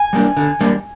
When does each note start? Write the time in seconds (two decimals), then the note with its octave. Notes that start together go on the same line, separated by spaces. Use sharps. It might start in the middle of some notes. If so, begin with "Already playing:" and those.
Already playing: G#5
0.13 G3 A#3 D4
0.37 D3
0.61 G3 A#3 D4